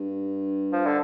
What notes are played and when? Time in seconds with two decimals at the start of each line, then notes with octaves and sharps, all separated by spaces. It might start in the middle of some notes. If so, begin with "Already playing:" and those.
Already playing: G2
0.73 F3
0.86 D3